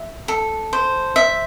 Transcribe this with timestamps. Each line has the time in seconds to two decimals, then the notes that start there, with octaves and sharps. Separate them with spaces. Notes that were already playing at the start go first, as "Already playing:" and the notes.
Already playing: E5
0.28 A4
0.73 C5
1.16 E5